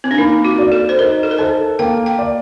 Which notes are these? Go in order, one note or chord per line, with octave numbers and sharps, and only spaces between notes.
C4
D4
A#3 D#4
F#4
D5
A4
C5
D#4 A#4
A4
A#4
A4 C5
A#3 G5
G5
D5